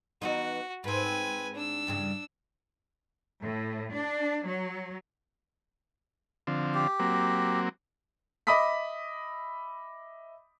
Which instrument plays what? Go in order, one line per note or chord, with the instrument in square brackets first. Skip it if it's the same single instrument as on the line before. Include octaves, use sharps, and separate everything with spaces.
[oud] E3 B3 D#4 [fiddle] F#4
[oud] G#2 C4 [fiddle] B4 G#5
[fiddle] D4 E6
[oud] E2 G2 C#3
[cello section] A2
D4
F#3
[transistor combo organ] D3 F3 C4
[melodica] G4
[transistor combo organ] F#3 A#3 C4
[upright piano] D#5 E5 B5 D6 D#6 B6